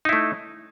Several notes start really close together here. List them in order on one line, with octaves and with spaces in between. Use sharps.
D#4 E4 A3